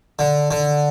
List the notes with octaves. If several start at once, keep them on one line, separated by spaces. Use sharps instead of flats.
D3
D3